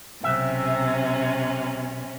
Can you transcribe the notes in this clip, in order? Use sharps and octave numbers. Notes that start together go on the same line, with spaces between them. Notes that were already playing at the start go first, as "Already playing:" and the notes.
B1 C3 C#4 E5